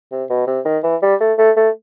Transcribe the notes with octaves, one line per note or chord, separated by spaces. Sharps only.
C3
B2
C3
D#3
E3
G3
A3
A3
A3